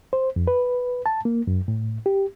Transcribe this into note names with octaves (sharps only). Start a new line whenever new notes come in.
C5
F2
B4
A5
A#3
F#2
A2
G4